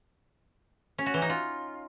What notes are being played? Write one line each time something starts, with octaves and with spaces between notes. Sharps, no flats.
C#4
F#4
E3
D#4
F4